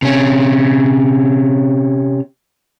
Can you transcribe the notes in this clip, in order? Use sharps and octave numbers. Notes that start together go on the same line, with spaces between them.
C3 C#4